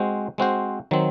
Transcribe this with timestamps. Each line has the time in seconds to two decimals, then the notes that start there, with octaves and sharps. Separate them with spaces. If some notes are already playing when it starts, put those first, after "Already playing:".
Already playing: G#3 C4 F#4 C5
0.38 G#3 C4 F#4 C5
0.91 D#3 F#3 C4